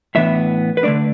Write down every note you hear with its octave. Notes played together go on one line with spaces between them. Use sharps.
A2 E3 B3 D4 E5
B4
D3 A3 D4 D5